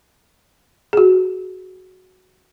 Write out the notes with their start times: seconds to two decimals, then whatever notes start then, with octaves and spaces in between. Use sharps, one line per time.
0.93 F#4 G#4